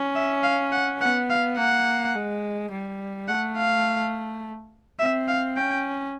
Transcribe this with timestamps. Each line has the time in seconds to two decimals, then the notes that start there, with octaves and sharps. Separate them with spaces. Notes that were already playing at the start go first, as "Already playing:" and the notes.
Already playing: C#4
0.15 E5
0.43 F5
0.72 F#5
1.00 B3 F#5
1.30 F5
1.57 A#3 F#5
2.15 G#3
2.71 G3
3.28 A3 F#5
3.57 F5
4.99 C4 E5
5.28 F5
5.56 C#4 G5